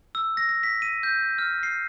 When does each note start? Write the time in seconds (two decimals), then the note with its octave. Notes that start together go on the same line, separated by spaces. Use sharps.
0.15 E6
0.37 A#6
0.49 A#6
0.63 B6
0.82 D#7
1.03 G6
1.38 F6
1.63 C7